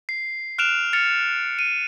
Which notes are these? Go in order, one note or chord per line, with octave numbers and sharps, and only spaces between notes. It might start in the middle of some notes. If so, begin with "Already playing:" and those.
C7
F6 F#6 D7 E7 F7
F6 A6 C#7 F7
D#7